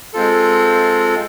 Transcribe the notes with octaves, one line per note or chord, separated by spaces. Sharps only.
G#3 C4 F4 A4